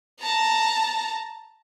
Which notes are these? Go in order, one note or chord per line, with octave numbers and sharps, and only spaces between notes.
A5 A#5